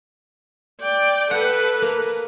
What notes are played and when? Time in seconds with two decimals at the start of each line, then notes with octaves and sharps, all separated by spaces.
0.80 D5 G5
1.31 A4 B4 F#5
1.82 A#3